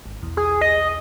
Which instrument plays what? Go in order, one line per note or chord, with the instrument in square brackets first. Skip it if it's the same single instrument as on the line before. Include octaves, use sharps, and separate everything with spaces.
[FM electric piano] G#1
B1 E2
[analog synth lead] G#4
D#5